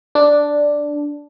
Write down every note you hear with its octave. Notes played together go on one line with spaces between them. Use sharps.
D4